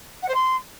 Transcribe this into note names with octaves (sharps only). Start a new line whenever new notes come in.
F#5
C5
C6